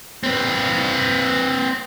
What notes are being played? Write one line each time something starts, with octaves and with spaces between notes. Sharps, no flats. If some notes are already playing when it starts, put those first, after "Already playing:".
C4 B4